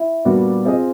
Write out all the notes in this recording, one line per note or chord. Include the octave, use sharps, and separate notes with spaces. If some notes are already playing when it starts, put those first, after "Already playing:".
Already playing: E4
A#2 G3 B3 D4 F#4
C4 F4 G#4 C5 D#5